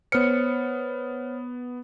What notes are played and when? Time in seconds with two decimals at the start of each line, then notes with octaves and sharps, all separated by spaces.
0.12 B3 C5 C#5 F6 C#7